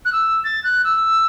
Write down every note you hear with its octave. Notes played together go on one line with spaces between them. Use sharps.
F#6
E6
A6
F#6
E6